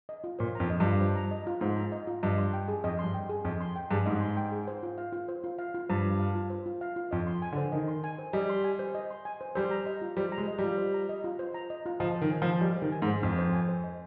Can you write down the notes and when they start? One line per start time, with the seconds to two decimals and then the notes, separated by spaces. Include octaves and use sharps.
0.09 D#5
0.24 F4
0.39 A#2 C5
0.55 F2 A#5
0.70 D#5
0.80 G2
0.86 F4
1.01 C5
1.16 A#5
1.31 D#5
1.47 F4
1.61 G#2 C5
1.77 A#5
1.92 D#5
2.07 F4
2.23 G2 D#5
2.38 C6
2.53 G5
2.68 G#4
2.84 F2 D#5
2.99 G2 C6
3.14 G5
3.29 G#4
3.45 F2 D#5
3.60 C6
3.76 G5
3.91 G2 G#4
4.06 G#2 D#5
4.21 C6
4.37 G5
4.52 G#4
4.68 C5
4.83 F4
4.98 F5
5.13 F4
5.28 C5
5.44 F4
5.59 F5
5.74 F4
5.89 G2 C5
6.04 F4
6.20 F5
6.35 F4
6.50 C5
6.66 F4
6.81 F5
6.96 F4
7.11 F2 D#5
7.27 C6
7.42 G#5
7.52 D3
7.57 C5
7.72 D#3 D#5
7.88 C6
8.04 G#5
8.19 C5
8.33 G3 D#5
8.50 C6
8.64 G#5
8.79 C5
8.95 D#5
9.11 C6
9.25 G#5
9.41 C5
9.55 G3 C5
9.71 A#5
9.86 D#5
10.02 F4
10.17 G3 C5
10.32 A#5
10.38 G#3
10.48 D#5
10.59 G3
10.64 F4
10.78 C5
10.94 A#5
11.09 D#5
11.24 F4
11.39 C5
11.54 A#5
11.70 D#5
11.86 F4
12.00 F3 D#5
12.16 C5
12.22 D#3
12.31 G#5
12.42 F3
12.46 C5
12.61 G3 D#5
12.76 C5
12.82 D#3
12.92 G#5
13.02 G#2
13.08 C5
13.23 F2 D#5
13.39 C5
13.53 G#5
13.69 C5
13.84 D#5